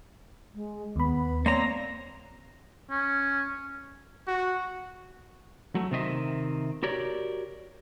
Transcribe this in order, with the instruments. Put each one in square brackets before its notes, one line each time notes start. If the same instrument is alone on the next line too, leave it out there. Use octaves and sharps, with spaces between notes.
[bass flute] G#3
[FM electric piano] D#2 B5 [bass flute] B3
[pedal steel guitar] A#3 C4 A#5 [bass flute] C#5 [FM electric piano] D5
[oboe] C#4
[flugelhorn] F#4
[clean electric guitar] F#3 A3
C3 D#3 C4 D#5 E5
F#4 G4 A#4 C#5 D5